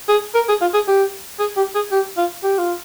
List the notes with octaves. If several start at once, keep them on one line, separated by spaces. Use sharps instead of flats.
G#4
A#4
G#4
F4
G#4
G4
G#4
G4
G#4
G4
F4
G4
F4